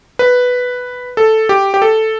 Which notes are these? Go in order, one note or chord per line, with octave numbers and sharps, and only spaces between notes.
B4
A4
G4
G4
A4